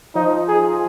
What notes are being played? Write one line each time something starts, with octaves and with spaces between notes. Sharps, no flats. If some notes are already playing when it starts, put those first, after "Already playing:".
F3 D#4
G#4